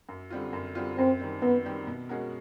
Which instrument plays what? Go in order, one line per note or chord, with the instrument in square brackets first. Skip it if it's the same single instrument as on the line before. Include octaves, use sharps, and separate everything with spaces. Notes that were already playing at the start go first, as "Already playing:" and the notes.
[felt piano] F#2
D3 G3 C4 F4
F#2
D3 G3 C4 F4
[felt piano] F#2 [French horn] C4
[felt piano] D#3 G3 C4
[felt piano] F#2 [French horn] B3
[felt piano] D#3 G3 C4
B2
G#3 C#4 F#4 A#4